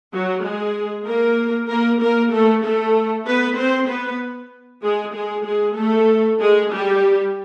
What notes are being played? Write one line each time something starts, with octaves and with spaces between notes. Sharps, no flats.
F#3 F#4
G#3 G#4
A#3 A#4
A#3 A#4
A#3 A#4
A3 A4
A3 A4
B3 B4
C4 C5
B3 B4
G#3 G#4
G#3 G#4
G#3 G#4
A3 A4
G#3 G#4
G3 G4